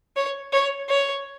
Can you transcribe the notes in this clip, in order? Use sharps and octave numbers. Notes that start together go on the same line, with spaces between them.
C#5
C#5
C#5